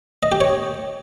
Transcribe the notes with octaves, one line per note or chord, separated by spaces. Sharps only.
D#5
G4
C#5